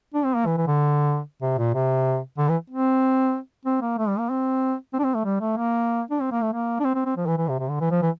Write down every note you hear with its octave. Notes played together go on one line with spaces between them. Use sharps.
D4
C4
A#3
E3
E3
D3
C3
A#2
C3
D3
E3
C4
C4
A#3
A3
G3
A#3
C4
C4
D4
C4
A3
G3
A3
A#3
D4
C4
A#3
A3
A#3
D4
C4
C4
C4
F3
E3
E3
C3
C3
D3
E3
F3
E3